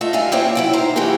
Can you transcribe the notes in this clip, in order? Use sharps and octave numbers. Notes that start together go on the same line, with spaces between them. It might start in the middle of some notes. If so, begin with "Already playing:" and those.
A3 F4 D#5 E5
F#2 G3 E5 F5 G#5
A#3 C4 E4 C5 C#5 G5
F#3 E4 G5
D#3 C5 A#5
E3 F#3 A#3 E4 G4 G#4